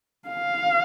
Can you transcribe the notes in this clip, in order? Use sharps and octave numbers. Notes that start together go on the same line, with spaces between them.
F5